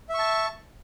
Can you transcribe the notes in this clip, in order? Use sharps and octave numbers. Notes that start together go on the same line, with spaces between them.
E5 A5 C#6